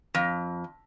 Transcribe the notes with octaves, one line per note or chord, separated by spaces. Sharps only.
F2